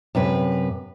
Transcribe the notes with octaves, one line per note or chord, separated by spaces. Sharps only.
F#2 C3 B4